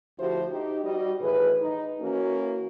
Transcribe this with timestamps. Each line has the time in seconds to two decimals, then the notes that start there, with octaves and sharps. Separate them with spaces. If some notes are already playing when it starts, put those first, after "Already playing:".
0.19 D2 F3 E4 F#4 G4 C5
0.52 D#4 G4
0.85 G3 F#4 D#5
1.21 A2 D#3 E3 G#4 B4
1.61 D#4
2.02 E3 A#3 C#4 F#4